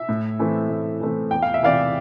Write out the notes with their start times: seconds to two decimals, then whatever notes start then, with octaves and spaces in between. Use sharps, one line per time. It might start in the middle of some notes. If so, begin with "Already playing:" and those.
Already playing: E5
0.09 A2
0.39 E3 A3 C4
0.70 A2
1.01 E3 A3 C4
1.31 E2 G5
1.42 F5
1.54 E5
1.63 C3 E3 D5 F5